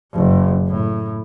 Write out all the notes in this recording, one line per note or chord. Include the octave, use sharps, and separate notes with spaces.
F#1
A2